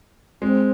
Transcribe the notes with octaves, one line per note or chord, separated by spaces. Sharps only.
G#3 C4